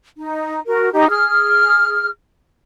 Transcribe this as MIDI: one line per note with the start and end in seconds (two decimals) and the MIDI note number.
0.17 0.60 63
0.67 0.90 66
0.67 0.90 70
0.92 1.05 63
0.92 1.05 67
1.09 2.09 68
1.09 2.09 89